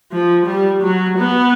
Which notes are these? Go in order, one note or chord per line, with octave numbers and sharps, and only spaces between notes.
F3
G3
F#3
B3